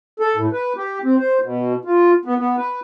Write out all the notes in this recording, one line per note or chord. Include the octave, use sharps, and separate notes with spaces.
A4
A2
B4
G4
C4
C5
B2
F4
B3
B3
B4